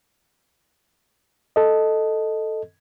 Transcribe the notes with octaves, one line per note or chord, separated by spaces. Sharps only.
A4 D#5